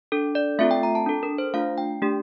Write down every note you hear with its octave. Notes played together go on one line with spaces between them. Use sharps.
D4 A4
D5
A3 C4 F4 A4 E5
G5
A#5
A5
D4 A4
A#4
C5
A3 D4 F4 F5
G5
A3 D4 G4